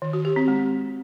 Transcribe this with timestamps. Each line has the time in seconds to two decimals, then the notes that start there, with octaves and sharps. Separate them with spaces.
0.02 D#3
0.13 F#4
0.25 G4
0.36 C4
0.48 G#3